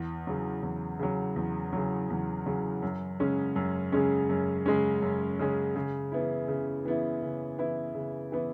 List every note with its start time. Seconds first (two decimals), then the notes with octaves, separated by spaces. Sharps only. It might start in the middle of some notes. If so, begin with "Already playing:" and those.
Already playing: E2
0.27 C#3 F#3
0.63 E2
0.99 C#3 F#3
1.36 E2
1.73 C#3 F#3
2.10 E2
2.46 C#3 F#3
2.82 F#2
3.20 C#3 G#3 C#4
3.56 F#2
3.92 C#3 G#3 C#4
4.29 F#2
4.66 C#3 G#3 C#4
5.02 F#2
5.39 C#3 G#3 C#4
5.76 C#3
6.12 E3 B3 E4
6.48 C#3
6.85 E3 B3 E4
7.22 C#3
7.59 E3 B3 E4
7.95 C#3
8.32 E3 B3 E4